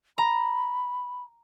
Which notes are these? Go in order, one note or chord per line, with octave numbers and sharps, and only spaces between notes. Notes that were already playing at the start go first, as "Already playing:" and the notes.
A#5 B5